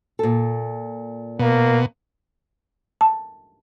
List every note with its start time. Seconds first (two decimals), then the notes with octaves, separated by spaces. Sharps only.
0.19 A#2 A4
1.39 B2 A#3
3.01 A5